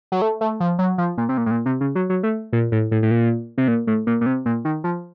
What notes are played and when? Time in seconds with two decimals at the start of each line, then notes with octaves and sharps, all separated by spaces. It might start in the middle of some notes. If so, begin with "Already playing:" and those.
0.12 F#3
0.22 A3
0.41 A3
0.60 F3
0.79 F#3
0.98 F3
1.18 A#2
1.29 C3
1.38 A#2
1.46 A2
1.51 A#2
1.66 C3
1.81 C#3
1.95 F#3
2.10 F#3
2.23 A3
2.53 A#2
2.72 A2
2.91 A2
3.03 A2
3.11 A#2
3.58 C3
3.68 A#2
3.87 A2
4.07 A#2
4.21 A#2
4.26 C3
4.46 A#2
4.65 D#3
4.84 F3